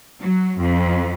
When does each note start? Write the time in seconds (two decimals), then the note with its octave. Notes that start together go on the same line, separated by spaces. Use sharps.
0.21 F#3
0.59 F2